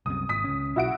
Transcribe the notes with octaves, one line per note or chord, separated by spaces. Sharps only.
C2 F#2 C3 D#6
G#1 D#6 B6
C#2 C#4
B1 E4 F#4 D7